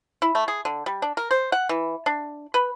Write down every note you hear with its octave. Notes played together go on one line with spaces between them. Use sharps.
E4
A3
G#4
D3
G3
D4
A#4
C5
F#5
E3
D4
B4